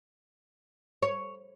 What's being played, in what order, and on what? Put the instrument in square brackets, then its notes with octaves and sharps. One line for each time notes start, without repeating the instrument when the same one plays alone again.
[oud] C#5